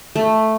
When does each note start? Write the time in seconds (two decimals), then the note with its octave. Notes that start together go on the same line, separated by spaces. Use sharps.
0.16 A3